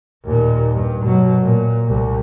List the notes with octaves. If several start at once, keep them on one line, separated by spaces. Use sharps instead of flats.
D#2 A#2
G2
B2 F#3
A#2
C2